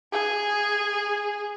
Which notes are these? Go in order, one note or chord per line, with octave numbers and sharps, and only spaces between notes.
G#4